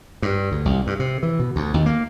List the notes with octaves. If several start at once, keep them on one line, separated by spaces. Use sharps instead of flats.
G2
D2
C2
G2
C3
E3
B2
D2
D#2
A#3